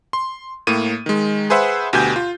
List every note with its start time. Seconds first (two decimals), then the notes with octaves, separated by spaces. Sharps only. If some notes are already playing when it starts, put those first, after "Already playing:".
0.13 C6
0.67 A2 A#3 D#7
1.06 D#3 G#3
1.50 G#4 B4 C5 E5 F#5
1.93 D2 B2 G4 G#5 G6
2.16 F4